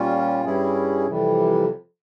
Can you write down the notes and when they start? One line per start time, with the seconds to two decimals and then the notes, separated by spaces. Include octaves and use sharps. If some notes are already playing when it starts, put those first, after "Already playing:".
Already playing: A#2 G3 C#4 F4
0.44 G2 G3 C#4 E4 G#4
1.07 F2 C3 E3 G3